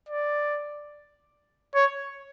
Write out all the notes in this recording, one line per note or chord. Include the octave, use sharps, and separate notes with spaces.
D5
C#5